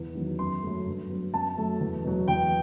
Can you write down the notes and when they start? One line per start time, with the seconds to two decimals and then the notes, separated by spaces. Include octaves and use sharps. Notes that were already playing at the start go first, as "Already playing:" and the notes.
Already playing: E2
0.15 D#3 F#3 B3
0.39 F#2 C6
0.62 F#3 A3
0.86 G2
1.10 F#3 B3
1.33 F#2 A5
1.57 F#3 A3
1.80 E2
2.04 B2 F#3
2.28 E2 G5